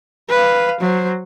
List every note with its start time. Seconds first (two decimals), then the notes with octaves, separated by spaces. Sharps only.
0.29 B4 F5
0.81 F#3 C5